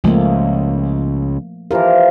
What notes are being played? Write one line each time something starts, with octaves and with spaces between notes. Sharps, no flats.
C#2 F3 A3 A#3
E3 F3 F4 G4 A#4